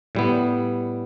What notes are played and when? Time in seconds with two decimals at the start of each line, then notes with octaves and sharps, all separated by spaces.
0.15 A2 G3 B3